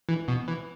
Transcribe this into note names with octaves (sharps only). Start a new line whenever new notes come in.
E3
B2
E3